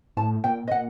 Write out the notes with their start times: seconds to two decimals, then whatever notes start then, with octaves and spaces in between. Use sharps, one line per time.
0.17 A2 A5
0.44 A#2 G5
0.68 D#5
0.71 A#2 F#5